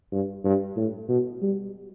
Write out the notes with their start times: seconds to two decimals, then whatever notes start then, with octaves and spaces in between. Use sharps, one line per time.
0.12 G2
0.44 G2
0.76 A2
1.09 B2
1.42 G3